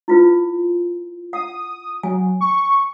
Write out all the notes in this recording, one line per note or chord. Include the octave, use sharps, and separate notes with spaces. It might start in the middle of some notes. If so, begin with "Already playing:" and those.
E4 F4 B4
F#5 D#6
F#3 G#5
C#6